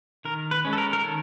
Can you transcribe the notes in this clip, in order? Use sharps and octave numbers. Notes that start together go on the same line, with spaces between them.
D#3 A#4
B4
G#3 C#4
A4
A#4
A#4
D#3 A4